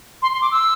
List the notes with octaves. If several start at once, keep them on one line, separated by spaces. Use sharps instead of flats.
C6
C6
D6
E6